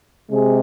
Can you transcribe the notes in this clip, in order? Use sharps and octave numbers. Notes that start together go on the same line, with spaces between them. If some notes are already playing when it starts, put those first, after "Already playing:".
C3 G#3 G#4